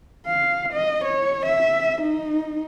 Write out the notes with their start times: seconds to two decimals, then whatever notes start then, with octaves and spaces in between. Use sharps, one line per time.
0.26 F5
0.73 D#5
1.04 C#5
1.46 E5
2.01 D#4